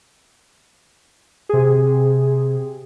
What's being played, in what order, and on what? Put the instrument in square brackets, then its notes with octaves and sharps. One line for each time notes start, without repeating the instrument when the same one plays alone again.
[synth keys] C3 G#4